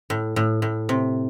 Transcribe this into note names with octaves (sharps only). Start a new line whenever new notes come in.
A2
A2
A2
C3